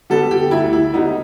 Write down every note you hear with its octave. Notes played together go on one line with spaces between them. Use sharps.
D3 G3 B3 A4
G4
D2 E4
E4
D3 G3 B3 D#4